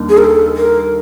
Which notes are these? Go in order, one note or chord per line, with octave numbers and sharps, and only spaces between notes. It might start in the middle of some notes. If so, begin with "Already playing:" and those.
Already playing: D#2 D#3 G3 A#3 D4
G#4
A#4
A4
A#4